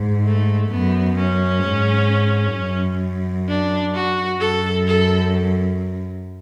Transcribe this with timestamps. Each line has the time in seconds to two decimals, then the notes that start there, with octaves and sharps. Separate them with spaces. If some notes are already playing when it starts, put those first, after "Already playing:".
Already playing: G#2
0.25 A3
0.70 F#2 B3
1.17 C#4
1.64 G#2
2.56 F#2
3.48 D4
3.95 F#4
4.40 F#2 A4
4.87 A4